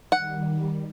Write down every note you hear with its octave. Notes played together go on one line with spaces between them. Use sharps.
D#3 G3 F#5